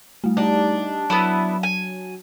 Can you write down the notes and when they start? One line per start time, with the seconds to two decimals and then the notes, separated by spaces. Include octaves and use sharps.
0.24 G3 A3
0.37 D4 D#4 G4
1.10 F#3 B3 E4 A5
1.63 G#5